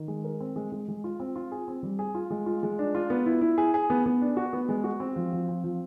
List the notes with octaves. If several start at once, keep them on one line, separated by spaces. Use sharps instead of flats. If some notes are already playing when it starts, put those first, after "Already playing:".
Already playing: D#3
G#3
A#4
C4
G#3
G#3
G#3
F4
C4
F4
G#4
C4
G3
G#4
F4
G#3
F4
G#3
D4
F4
B3
E4
E4
G#4
G#4
B3
B3
D4
F#4
B3
G#3
F#4
C4
F3
F3
C4
F3